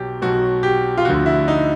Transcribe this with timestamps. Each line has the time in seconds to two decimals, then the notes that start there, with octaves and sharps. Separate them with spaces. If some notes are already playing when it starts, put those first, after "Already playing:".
Already playing: B1 B2 F#3 G4
0.21 B1 B2 F#3 F#4
0.63 G4
0.98 F4
1.05 D2 D3 F3 F#4
1.26 E4
1.48 D#4